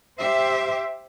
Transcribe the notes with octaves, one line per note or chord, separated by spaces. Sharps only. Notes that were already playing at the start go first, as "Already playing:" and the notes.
G4 C5 E5